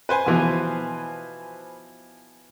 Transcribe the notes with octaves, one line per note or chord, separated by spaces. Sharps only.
B4 C5 G#5
B2 E3 F3